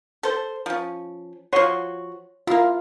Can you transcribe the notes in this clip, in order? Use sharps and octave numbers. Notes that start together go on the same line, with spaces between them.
A4 C5
F3 C#4
F3 F#4 C#5 C6
A#3 E4 F4